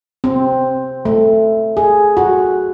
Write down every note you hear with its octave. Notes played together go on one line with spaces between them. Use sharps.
C4
A3
G#4
F#4